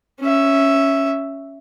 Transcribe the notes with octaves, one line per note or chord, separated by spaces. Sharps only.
C#4 E5